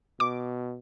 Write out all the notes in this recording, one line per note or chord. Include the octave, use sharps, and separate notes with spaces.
B2 D6